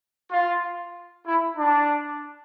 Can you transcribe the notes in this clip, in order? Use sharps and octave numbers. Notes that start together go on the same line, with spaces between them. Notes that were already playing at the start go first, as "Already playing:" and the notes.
F4
E4
D4